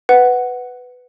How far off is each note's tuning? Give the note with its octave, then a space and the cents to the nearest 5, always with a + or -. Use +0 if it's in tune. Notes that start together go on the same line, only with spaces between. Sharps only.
B4 +10 F#5 +0